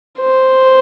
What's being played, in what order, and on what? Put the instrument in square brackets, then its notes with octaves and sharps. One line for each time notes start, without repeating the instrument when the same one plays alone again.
[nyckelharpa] C5